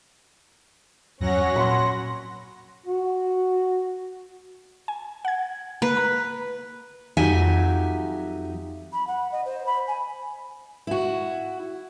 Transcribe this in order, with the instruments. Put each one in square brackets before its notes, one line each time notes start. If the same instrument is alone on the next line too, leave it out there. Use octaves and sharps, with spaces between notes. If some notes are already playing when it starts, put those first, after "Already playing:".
[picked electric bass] E2 G2 F3 [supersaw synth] F#3 F#5 A#6 [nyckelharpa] C#4 C#5
[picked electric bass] A#2 [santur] B5 C6
[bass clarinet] F#4
[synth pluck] G#5
F#5 G#6
[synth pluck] A#3 [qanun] B4
[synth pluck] A#5
[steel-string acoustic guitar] F2 F#3 D#4 G4 E5 G#5
[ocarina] B5
F#5
D#5
C5
B5
G#5
[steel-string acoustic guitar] E4 F#4